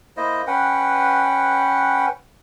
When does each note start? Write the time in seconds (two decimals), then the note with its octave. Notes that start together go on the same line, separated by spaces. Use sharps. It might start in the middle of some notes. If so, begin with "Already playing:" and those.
0.17 A#3 E4 C5 D#5
0.47 C#4 B4 F#5 G5